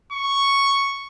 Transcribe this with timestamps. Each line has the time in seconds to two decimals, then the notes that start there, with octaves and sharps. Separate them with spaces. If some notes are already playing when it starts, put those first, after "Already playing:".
0.12 C#6